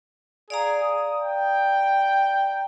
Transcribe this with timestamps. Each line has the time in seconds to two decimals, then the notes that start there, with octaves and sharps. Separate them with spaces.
0.50 G#4 D5 F5 A#5
0.83 D#6
1.21 G5